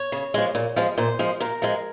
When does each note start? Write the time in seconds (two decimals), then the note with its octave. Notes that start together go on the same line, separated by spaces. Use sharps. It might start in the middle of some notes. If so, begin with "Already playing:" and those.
Already playing: C#5
0.12 C#3
0.34 F3 G#3
0.55 A#2
0.76 F3 G#3
0.98 A#2 C5
1.19 F3 G#3
1.40 A#2 A#4
1.62 F3 G#3